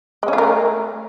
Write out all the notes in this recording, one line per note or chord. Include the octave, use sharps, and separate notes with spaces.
G#3
C#4
F4
A#4
A3